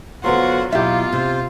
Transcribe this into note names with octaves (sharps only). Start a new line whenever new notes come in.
D3 F#3 B3 F4 F#4 C5 C6
B2 F#3 A#3 E4 F4 G4 E5
C3 C5